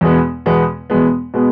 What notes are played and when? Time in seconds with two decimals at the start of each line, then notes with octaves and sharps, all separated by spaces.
0.01 E2 B2 G#3 B3
0.46 E2 B2 G#3 B3
0.90 E2 B2 G#3 B3
1.34 B2 G#3 B3